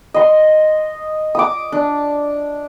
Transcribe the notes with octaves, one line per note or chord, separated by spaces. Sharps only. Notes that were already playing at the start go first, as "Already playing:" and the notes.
D#5 C6
D6 D#6
D4